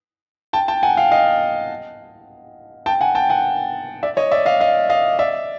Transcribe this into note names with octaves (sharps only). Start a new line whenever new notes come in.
G5 A5
G5 A5
F#5 G#5
F5 G5
D#5 F5
G5 A5
F#5 G#5
G5 A5
F#5 G#5
D5 E5
C#5 D#5
D5 E5
D#5 F5
D#5 F5
D#5 F5
D5 E5